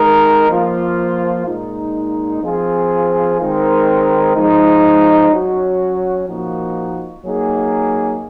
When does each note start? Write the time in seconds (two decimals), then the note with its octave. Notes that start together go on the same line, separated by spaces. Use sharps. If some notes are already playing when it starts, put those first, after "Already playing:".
Already playing: G#3 D#4 A#4
0.50 F3 A#3 F4
1.47 A#2 G#3 D#4
2.44 F3 C4 F4 G#4
3.39 D#3 G#3 C4 D#4 A#4
4.36 F3 G#3 D#4
5.33 F#3 C#4 F#4
6.29 A#2 F3 A#3 D#4 F#4
7.26 F#3 A#3 D#4 G#4